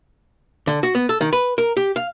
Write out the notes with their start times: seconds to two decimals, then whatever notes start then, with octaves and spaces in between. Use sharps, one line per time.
0.67 D3
0.83 F#4
0.95 B3
1.09 A4
1.21 D#3
1.33 B4
1.58 A#4
1.77 G4
1.96 F5